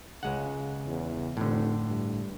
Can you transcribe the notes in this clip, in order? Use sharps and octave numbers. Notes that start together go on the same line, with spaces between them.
C#2 C#3 G#3 F#5
E2
F1 A2 D3
G2